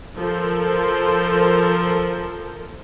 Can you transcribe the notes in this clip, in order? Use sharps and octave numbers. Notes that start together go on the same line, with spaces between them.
F3 A4 A#4 C5